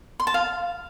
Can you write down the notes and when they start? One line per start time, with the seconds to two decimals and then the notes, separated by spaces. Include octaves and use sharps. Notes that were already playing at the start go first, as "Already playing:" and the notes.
0.20 C6
0.27 A5
0.34 F5